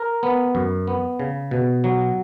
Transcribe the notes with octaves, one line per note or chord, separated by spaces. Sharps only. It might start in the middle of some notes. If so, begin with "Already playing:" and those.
Already playing: A#4
B3
F#2
B3
C#3
B2
F#3